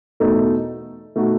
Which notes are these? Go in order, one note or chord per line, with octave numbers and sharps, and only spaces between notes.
E2 B2 A3 D#4 A4
B2 A3 D#4 F#4